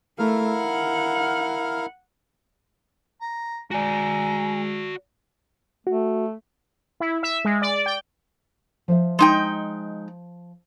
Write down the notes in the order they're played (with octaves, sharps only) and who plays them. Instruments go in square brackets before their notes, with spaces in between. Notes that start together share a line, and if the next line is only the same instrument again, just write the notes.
[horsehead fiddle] A3 [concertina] E4 A#4 F5
[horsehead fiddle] F#5
[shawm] A#5
[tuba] G#3 [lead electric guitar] F#4 D5 [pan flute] G#5 [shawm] A#5
[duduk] A3 [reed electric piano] F#4
[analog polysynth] E4
E5
G#3
D5
G5
[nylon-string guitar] F3 C5 E5
[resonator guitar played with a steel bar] G#3 D#4 G5